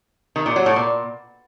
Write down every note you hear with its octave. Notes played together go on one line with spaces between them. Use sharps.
D#3
A#2
F#3
A2
A#2